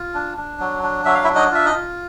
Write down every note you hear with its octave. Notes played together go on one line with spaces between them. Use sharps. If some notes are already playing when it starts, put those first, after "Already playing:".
Already playing: F4
D4
D4
F#3
D4
F#3 E5
F5
E4 E5
D4
D#4 D#5
F4 E5
D#4 D#5
F4